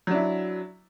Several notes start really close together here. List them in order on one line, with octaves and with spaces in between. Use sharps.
F#3 D4 E4